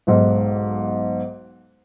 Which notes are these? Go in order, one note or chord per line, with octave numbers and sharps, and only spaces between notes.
B1 G#2